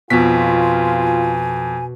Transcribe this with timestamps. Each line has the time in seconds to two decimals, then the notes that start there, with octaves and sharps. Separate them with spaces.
0.10 F2 B2 F4 G#5 B6